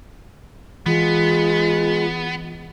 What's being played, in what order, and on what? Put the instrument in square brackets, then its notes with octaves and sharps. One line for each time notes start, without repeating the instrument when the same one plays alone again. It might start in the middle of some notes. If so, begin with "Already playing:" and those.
[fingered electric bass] E3 [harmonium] G#3 [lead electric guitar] B3 [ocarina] F4